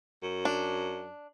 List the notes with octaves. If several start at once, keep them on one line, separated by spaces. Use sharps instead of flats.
F#2
D4